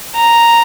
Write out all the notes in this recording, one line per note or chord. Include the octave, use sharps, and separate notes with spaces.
A#5